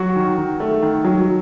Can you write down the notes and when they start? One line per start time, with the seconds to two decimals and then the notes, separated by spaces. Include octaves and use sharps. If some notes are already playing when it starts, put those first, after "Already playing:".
Already playing: F#3 F#4
0.16 D#3
0.37 D#3
0.60 A3
0.82 D#3
1.05 F#3